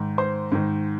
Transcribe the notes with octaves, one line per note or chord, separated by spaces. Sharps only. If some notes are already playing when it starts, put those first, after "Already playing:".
Already playing: G#2 D#3
C5 C6
G#2 D#3